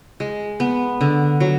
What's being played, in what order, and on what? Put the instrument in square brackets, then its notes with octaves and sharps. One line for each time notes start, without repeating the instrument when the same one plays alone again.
[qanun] G#3
B3
D3
F#3